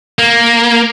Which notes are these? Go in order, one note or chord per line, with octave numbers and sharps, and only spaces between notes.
A#3